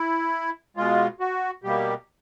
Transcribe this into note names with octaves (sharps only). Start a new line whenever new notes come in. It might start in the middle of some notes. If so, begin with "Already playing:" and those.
Already playing: E4
B2 G#3 F4
F#4
B2 G3 A#3 G4